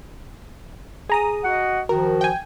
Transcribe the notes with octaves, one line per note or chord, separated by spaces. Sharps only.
G#4 A#5 D#6
F#4 D#5 F#5
D#3 F3 F#4 A#4
G5 G#5